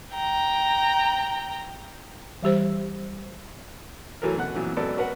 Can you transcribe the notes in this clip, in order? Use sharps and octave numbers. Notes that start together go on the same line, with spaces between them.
G5 A#5
E3 G3 G4 C5
E3 F#3 A3 A4 A#4
B2 D3 F#5 F#6
F2 A#2 E3 F#3
G#1 F#3 B3 A4 D5
F#4 A#4 B4 F#5